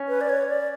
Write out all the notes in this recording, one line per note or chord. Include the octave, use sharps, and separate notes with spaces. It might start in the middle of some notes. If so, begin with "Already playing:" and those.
Already playing: C#4
B4
D5
C#5
D5